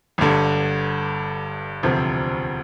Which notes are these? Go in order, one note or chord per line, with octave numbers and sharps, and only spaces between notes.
G1 G2 D3
E1 D2 C3 F3 C4